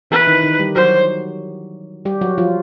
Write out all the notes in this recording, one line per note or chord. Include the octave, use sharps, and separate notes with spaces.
E3 E4 B4
D#3 D#4
D#3 D#4
G3 G4
F#3 F#4 C5
G3 G4
F#3 F#4
F3 F4